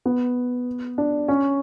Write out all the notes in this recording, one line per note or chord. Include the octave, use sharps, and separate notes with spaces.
B3
D4
C#4